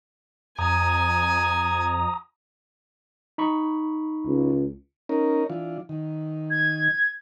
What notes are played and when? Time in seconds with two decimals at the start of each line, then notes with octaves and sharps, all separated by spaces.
0.59 F2 G#5 A#5 D#6
3.38 D#4 B5 C#6
4.27 C#2
5.09 C#4 D#4 A#4
5.50 E3 D4 F4
5.89 D#3
6.51 G#6